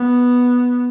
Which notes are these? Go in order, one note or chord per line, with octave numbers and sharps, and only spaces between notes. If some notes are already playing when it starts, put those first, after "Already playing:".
Already playing: B3